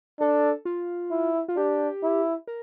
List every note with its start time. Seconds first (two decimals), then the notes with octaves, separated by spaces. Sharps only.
0.20 D4 A4
0.65 F4
1.11 E4
1.48 F4
1.57 D4 G4
2.03 E4
2.48 A#4